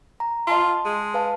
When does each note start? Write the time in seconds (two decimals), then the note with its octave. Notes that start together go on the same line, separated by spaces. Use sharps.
0.20 A#5
0.47 F4 D#5 A5 C6
0.85 G#3
1.14 B4 F5 A5